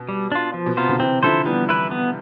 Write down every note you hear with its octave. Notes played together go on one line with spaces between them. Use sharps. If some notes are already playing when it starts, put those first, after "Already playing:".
Already playing: B2
G3
D4 F4
F3
B2
C3 B3 F4 C5
B2 D3
C3 E3 C4
D3 F3 E4 A4 C5
E3 G3 B3
E4 B4
B3